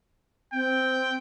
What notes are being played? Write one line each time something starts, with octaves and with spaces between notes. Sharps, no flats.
C4 G5